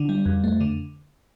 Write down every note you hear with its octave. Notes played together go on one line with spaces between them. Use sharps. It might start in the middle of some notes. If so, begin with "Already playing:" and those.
Already playing: D3
G3
F2
A3
D3